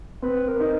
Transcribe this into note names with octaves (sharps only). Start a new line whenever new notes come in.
C4 B4
A#4
D#4